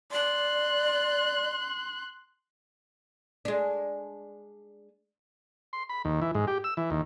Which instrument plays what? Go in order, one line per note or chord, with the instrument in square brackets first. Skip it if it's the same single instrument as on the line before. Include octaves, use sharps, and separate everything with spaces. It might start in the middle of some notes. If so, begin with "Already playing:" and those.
[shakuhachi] D5 [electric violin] C6 F#6
[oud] G#3 D4
[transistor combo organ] C6
B5
D#2
E3
G#2
G4
E6
E3
D#2